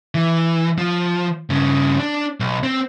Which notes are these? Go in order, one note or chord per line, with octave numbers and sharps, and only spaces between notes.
E3
F3
G2 C#3
D4
B1
C4